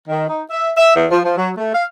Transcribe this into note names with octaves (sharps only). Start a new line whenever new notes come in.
D#3
D#4
E5
E5
E2
F3
F3
F#3
A3
F5